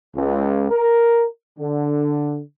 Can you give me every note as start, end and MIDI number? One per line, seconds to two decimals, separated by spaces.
0.14 0.66 37
0.70 1.24 70
1.58 2.39 50